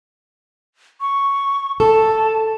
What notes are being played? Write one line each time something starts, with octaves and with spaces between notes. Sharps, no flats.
C#6
A4 A5